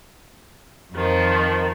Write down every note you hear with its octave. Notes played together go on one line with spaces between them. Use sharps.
F2 D#3 F3